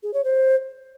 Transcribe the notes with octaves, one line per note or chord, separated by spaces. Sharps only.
G#4
C#5
C5